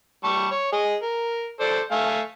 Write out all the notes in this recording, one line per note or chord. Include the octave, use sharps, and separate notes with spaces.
G3 A5 C#6
C#5
G#4 D#5
A#4
A4 C5 D5
A3 F5 G#5